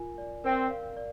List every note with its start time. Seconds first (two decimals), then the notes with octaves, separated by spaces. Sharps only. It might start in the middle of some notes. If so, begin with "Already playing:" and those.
Already playing: F4 A#4 G#5
0.18 D5
0.44 C4 A#4
0.70 F5
0.97 D5